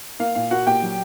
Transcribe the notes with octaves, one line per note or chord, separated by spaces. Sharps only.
A#3 F5
A#2 F5
A#3 F#4 F#5
A#2 G4 G5
F#3